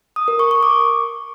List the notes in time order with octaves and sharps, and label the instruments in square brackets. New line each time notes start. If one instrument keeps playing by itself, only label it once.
[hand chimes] D#6
A#4
C#6
C#6
D6